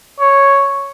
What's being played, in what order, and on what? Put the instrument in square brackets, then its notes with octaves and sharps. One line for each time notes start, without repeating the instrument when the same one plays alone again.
[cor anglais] C#5